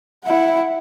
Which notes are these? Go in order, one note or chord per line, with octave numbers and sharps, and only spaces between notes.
E4 F#5